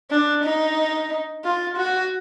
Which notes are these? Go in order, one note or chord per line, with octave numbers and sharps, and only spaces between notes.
D4
D#4
F4
F#4